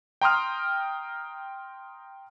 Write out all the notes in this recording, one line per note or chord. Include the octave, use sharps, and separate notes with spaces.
G5 A#5 C6 D#6 F6